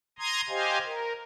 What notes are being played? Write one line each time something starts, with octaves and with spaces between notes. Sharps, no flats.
A#5 C6 D#6 G#6
G4 C5 D#5 F5 G#5
A#4